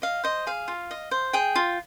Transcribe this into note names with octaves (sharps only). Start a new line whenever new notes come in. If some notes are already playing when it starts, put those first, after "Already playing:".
D#5 F5
C5 D#5
G#4 F5
F4
D#5
C5
G#4 G5
F4